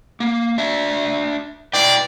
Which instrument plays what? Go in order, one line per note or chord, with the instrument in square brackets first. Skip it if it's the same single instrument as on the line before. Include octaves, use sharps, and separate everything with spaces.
[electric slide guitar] A#3
D4 E5
[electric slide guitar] E4 B4 G5 [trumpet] D5